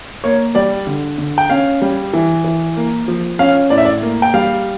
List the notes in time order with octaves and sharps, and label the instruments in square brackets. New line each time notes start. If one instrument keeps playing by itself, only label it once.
[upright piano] A#3 C#5
G3 D5
D3
D3
G5
C#4 F5
G3
E3
E3
A#3
F3
C#4 F5
A2 D5
E5
D5
A#3
G5
G3 F5